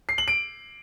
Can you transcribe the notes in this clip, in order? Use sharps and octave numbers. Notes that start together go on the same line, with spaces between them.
C7
F#7
D7